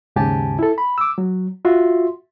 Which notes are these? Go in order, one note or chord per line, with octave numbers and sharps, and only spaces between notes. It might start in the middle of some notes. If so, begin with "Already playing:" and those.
D#2 G#2 C#3 G4 G#5 A5
E4 A4
B5
D6 E6
F#3
F4 F#4 E5 C6